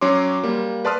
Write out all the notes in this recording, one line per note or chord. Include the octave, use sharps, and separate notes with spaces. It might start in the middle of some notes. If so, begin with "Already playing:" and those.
F#3 C#4 C#5 C6 D6
G3 A#3
B4 D5 A5 C6 D#6 F6